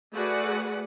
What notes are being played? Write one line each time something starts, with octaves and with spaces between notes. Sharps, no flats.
A3 F#4 G#4 B4 D5 F#5